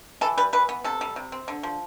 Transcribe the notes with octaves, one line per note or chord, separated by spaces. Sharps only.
E3 A4
G3 B4
E3 B4
B3
C3 A4
G3
C3
C4
D3
F3